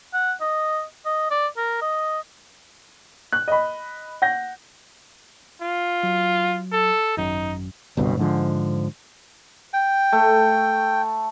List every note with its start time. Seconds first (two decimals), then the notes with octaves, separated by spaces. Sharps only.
0.14 F#5
0.41 D#5
1.06 D#5
1.31 D5
1.57 A#4
1.81 D#5
3.33 F#6
3.48 D#5 B5
4.22 F#5 G6 A#6
5.61 F4
6.03 F#3
6.72 A4
7.17 G#1 F#2 D#4
7.97 G1 C2 G2 B2
8.17 G#2 D3 F3
9.73 G5
10.12 A3